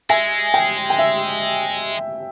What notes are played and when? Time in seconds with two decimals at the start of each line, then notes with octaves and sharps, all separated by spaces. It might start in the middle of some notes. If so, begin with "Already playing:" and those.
0.10 G#3 E5 G#5
0.54 G5
0.90 G5
0.99 E5